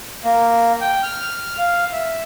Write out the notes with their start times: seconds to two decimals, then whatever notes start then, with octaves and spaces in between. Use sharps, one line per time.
0.24 A#3
0.81 G5
1.03 F6
1.58 F5
1.92 E5